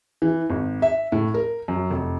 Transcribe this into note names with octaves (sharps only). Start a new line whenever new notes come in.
E3
G#1
E5
A2
A#4
F#2
F1